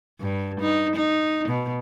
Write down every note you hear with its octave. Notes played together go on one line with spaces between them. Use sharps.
G2
D#4
D#4
B2